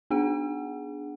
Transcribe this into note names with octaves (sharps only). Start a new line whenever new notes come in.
B3 D4 G#4 F#5